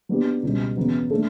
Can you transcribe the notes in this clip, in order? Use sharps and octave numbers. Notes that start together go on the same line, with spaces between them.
F#3 B3 D4 G4
C#2 B2 G3
E2 C#3 F#3 B3
A3 D4 A4